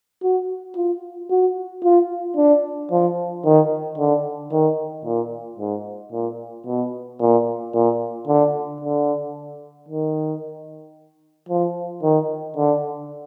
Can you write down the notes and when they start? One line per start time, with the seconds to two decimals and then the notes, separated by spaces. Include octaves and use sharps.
0.23 F#4
0.76 F4
1.30 F#4
1.83 F4
2.37 D4
2.91 F3
3.45 D#3
3.98 D3
4.52 D#3
5.05 A#2
5.59 G#2
6.12 A#2
6.67 B2
7.21 A#2
7.74 A#2
8.28 D3
8.81 D3
9.88 D#3
11.49 F3
12.03 D#3
12.57 D3